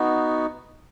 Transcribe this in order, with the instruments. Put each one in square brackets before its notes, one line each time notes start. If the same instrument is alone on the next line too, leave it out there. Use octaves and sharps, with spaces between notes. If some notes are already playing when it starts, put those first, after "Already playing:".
Already playing: [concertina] B3 D#4 F#4